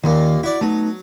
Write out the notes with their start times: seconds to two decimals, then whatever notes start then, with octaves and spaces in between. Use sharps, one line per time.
0.04 D#2 A#2 D#3 A#3
0.43 E4 F#4 D5
0.61 F#3 A3 B3 D#4